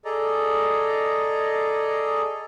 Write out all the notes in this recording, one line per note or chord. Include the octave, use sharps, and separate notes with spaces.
G#4 A4 D5 D#5 A#5